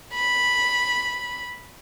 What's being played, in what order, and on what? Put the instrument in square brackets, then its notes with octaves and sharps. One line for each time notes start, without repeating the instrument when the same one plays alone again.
[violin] B5